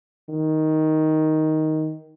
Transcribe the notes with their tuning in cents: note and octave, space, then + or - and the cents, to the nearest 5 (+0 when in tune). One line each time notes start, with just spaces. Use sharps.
D#3 +5